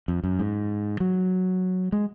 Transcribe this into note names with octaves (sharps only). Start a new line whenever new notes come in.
F2
F#2
G#2
F#3
G#3